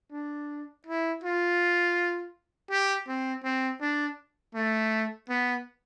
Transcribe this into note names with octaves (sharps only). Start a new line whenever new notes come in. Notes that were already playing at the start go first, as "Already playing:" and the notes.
D4
E4
F4
G4
C4
C4
D4
A3
B3